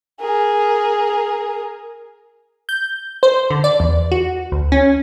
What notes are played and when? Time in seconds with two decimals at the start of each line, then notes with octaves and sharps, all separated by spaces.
0.20 G#4 A#4
2.69 G6
3.23 C5
3.50 D3
3.64 D5
3.80 E2
4.12 F#4
4.52 D2
4.72 C#4